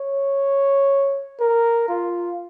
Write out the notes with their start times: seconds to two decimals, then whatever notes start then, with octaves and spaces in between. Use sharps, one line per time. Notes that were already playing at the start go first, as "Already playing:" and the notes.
Already playing: C#5
1.40 A#4
1.89 F4